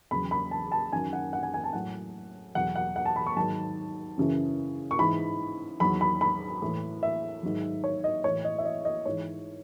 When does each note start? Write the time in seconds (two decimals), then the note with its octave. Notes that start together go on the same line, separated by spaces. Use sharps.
0.11 E2 C#3 F#3 B5
0.31 B5
0.51 A5
0.72 A5
0.93 F#2 D#3 F#3 G#5
1.13 F#5
1.33 F#5
1.43 G#5
1.54 G#5
1.64 A5
1.73 A2 F#3 F#5
2.55 E2 B2 F#3 F#5
2.76 F#5
2.96 F#5
3.06 A5
3.16 B5
3.27 C#6
3.36 G#2 D#3 F#3 A5
4.18 F#2 C#3 E3
4.91 C#6
4.99 G#2 E3 B5
5.80 E2 D#3 F#3 B5
6.01 B5
6.21 B5
6.62 A2 E3
7.03 E5
7.43 G#2 D#3 F#3
7.84 C#5
8.04 D#5
8.24 A2 E3 C#5
8.45 D#5
8.58 E5
8.65 D#5
8.85 D#5
9.05 G#2 E3 C#5